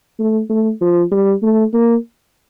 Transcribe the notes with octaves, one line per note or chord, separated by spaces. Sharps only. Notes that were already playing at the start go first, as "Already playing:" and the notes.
A3
A3
F3
G3
A3
A#3